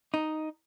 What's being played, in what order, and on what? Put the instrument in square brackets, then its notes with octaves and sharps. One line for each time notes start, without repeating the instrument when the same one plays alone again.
[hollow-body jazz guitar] D#4